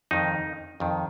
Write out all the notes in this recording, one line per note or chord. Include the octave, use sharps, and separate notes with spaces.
F2 D#3 D#4
F2 D#3